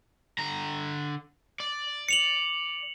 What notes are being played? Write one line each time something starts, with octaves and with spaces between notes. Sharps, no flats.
D3 A#5
D5
C#7 F7 F#7